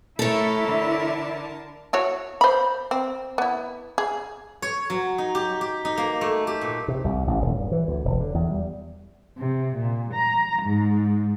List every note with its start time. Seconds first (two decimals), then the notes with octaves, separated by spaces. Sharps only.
0.19 A3 E4 A4 A#4 C#5 A5
0.68 D3
1.93 E4 F#4 C#5
2.41 C5 B5
2.91 C4
3.38 B3 E4
3.98 G#4
4.62 C#5
4.90 F#3
5.18 D#4
5.35 G4
5.61 G4
5.85 D#4
5.97 A#3
6.21 A3
6.47 G4
6.61 A#2
6.88 C3
7.04 C2
7.27 A1
7.42 D#1
7.55 G2
7.72 E3
7.88 D2
8.05 E1
8.20 D3
8.34 E2
8.51 G3
9.38 C3
9.75 A#2
10.14 A#5
10.63 G#2